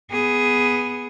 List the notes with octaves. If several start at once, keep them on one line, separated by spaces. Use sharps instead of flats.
B3 G#4